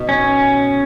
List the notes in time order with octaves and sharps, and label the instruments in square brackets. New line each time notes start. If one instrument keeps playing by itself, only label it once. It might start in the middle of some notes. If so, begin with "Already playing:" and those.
Already playing: [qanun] B2 D#4
[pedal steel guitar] C#4